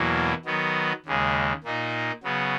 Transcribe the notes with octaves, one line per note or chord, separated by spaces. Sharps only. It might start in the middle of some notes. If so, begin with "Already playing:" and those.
Already playing: E2 B2 F#3 A#3 E4
D#3 F#3 B3
D#2 C#3 G#3
A#2 A#3 D#4
C#3 F#3 B3